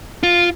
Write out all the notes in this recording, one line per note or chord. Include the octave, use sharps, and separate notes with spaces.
F4